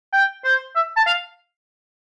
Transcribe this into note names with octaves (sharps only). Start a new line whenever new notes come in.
G5
C5
E5
A5
F5